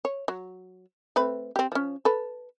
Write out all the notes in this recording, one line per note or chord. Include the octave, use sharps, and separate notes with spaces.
C#5
F#3
A3 C4 B4
C4 G4
F3 C#4
A4 B4